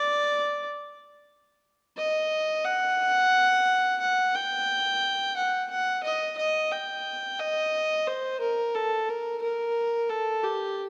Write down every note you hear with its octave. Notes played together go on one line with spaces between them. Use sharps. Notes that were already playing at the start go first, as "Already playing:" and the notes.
Already playing: D5
D#5
F#5
F#5
G5
F#5
F#5
D#5
D#5
G5
D#5
C5
A#4
A4
A#4
A#4
A4
G4